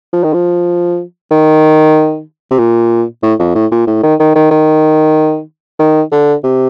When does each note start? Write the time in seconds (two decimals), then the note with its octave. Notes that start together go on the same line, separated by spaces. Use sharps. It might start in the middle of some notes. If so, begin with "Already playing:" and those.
0.13 F3
0.23 D#3
0.33 F3
1.31 D#3
2.51 C3
2.58 A#2
3.23 A2
3.39 F2
3.55 A2
3.71 A#2
3.87 A2
4.03 D#3
4.19 D#3
4.35 D#3
4.51 D#3
5.79 D#3
6.12 D3
6.44 C3